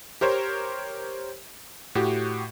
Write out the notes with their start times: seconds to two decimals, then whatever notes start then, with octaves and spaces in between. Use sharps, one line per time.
0.21 G4 A#4 C5 C#5
1.95 A2 F#4 G4